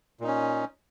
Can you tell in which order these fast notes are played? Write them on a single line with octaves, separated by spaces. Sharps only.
A#2 D#4 C#4